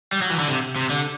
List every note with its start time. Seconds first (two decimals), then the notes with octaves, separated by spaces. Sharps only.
0.12 G3
0.22 F#3
0.30 E3
0.39 D3
0.48 C3
0.76 C3
0.90 D3